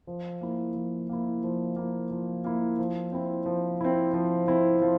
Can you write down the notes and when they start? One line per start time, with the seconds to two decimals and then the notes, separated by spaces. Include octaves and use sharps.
0.07 F3
0.41 A#3 E4
0.76 F3
1.09 A#3 E4
1.44 F3
1.76 A#3 E4
2.11 F3
2.44 A#3 E4
2.79 F3
3.12 C4 E4
3.46 F3
3.81 C4 E4
4.13 F3
4.47 C4 E4
4.82 F3